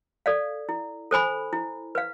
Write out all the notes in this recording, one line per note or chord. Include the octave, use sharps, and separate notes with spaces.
A4 D5 F5
E4
A4 C5 G#5 B5
E4
B4 F5